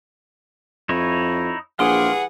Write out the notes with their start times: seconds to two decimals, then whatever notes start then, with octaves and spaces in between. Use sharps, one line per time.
0.89 F2 D#4 E4 C#5
1.79 A#1 E3 G3 G#4 F5 F#5 C6 D6